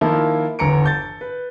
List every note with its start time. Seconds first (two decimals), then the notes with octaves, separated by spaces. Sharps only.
0.01 D#3 F3 A#3 E4
0.59 G1 E2 A#5 C#7 D7
0.84 A5 G6 A6
1.21 B4